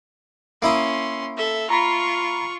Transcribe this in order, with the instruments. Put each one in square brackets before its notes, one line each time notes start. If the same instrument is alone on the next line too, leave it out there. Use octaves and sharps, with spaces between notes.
[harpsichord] A#3 E4 D#6 [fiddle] C#4 C6
[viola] A4 [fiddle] E5
[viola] F4 [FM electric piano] A#5 B5 [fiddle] C#6